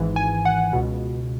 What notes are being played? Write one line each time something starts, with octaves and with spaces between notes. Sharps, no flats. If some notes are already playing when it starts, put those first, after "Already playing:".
Already playing: G#1 G#2 E3
G#5
F#5
C#2 B2